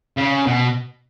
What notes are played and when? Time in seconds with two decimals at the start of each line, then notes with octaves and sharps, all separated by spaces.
0.17 C#3
0.47 B2